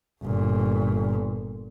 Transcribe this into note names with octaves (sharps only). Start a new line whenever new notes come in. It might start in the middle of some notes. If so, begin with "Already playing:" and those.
G1 A#2